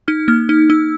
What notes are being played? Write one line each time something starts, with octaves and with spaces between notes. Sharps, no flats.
D#4 F6
A#3 F6
D#4 F6
D#4 E6